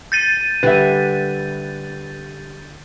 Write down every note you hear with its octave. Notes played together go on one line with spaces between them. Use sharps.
G6 A6 D#7
D3 G3 B4 E5